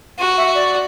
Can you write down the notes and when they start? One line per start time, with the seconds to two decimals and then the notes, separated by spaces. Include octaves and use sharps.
0.19 F#4
0.37 E5
0.55 D5